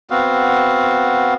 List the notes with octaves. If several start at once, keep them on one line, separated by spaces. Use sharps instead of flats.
B3 C4 F#4 F5